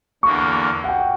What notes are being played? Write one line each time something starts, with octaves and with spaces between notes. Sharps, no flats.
E2 D3 A#3 C#6
F#5
G5